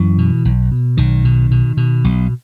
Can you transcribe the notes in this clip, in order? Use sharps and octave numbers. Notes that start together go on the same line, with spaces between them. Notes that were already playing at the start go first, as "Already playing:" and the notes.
Already playing: F#2 E3
B2
B1
B2
B1 D#3
B2
B2
B2
B1